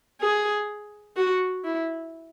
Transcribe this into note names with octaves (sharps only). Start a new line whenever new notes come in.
G#4
F#4
E4